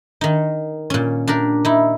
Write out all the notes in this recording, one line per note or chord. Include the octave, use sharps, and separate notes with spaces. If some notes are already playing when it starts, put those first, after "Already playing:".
D#3 D#4
A#2 C#4
D4 G4 A#4
D#4 E4